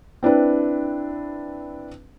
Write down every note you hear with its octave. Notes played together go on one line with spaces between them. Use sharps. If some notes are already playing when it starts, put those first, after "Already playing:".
C4 D4 E4 B4